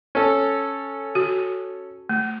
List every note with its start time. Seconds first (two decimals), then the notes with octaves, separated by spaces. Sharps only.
0.15 C#4 A4
1.15 F#4
2.09 A3